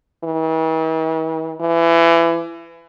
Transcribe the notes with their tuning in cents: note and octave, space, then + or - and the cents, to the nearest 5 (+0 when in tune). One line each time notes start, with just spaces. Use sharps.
E3 -45
E3 +25